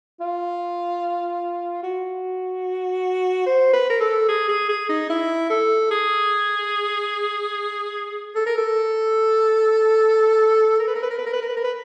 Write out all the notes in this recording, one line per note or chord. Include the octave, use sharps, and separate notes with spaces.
F4
F#4
C5
B4
A#4
A4
G#4
G#4
G#4
D#4
E4
A4
G#4
A4
A#4
A4
A#4
B4
A#4
B4
A#4
B4
A#4
B4
A#4
B4
A#4
B4